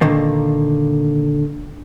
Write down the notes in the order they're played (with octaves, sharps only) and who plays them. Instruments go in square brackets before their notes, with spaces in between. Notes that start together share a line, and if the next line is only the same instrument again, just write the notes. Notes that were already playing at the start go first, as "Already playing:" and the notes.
[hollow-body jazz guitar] A#2 D3 D#3 A#3